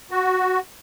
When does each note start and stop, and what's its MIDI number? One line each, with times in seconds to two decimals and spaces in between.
0.11 0.59 66